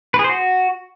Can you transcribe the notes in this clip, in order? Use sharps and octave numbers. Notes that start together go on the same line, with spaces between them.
B4
G#4
C5
F#4